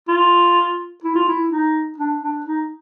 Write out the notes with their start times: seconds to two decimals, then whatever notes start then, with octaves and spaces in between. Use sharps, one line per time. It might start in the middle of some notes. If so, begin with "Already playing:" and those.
0.08 F4
1.04 E4
1.15 F4
1.28 E4
1.50 D#4
1.98 D4
2.21 D4
2.46 D#4